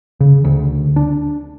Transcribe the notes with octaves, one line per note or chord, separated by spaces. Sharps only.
C#3
D2
D4